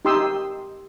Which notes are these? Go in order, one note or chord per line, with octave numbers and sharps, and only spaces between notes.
D#4 G4 G5 C6 D#6 E6